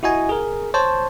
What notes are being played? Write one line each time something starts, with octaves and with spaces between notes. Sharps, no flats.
E4 F#4 D#5 G#5
G#4 A#4
C5 C#5 A5